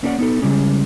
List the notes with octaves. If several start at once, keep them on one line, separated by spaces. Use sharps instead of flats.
A#3 C#4 E4 A4 D5 F#5
B3 D#4 A4
C#3 G3 G#3 C#4